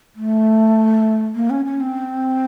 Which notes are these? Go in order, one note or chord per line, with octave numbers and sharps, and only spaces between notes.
A3
A#3
C#4
C#4
C4